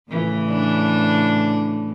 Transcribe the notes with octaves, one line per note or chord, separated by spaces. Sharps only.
A2 C#3 E3
D4